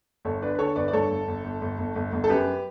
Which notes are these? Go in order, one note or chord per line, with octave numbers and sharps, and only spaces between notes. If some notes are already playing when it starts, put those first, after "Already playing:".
G1 A4 C#5
D3 B4 D5
B4
D3 A4 C#5
G1 B4 D5
D5
G2 A4 C#5
G1
G1
G1
G1
G1
G1
G1
A4
F#2 G4 B4